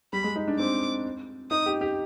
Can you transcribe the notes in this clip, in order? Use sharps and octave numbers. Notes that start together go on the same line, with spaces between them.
G3 B5
G#3
D#4
D4
C4 D6
D#4 D#6
G4
G4